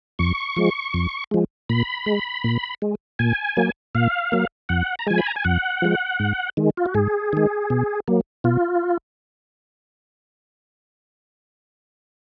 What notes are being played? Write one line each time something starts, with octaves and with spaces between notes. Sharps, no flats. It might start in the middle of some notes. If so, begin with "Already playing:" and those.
F2 C#6
F3 G#3
F2
F3 G#3
A#2 B5
G#3
A#2
G#3
A#2 G#5
F#3 A#3
A#2 F5
F#3 A#3
F2 F#5
A#5
F3 G#3 G#5
B5
A#5
G#5
F2 F#5
F3 G#3
G#2
D#3 G#3
F4
F#4
G#2 G#4
D#3 G#3
B2
F#3 A#3
B2 F4